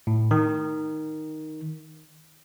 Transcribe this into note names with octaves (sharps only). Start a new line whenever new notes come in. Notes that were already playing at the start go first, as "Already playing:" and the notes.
A2
D#3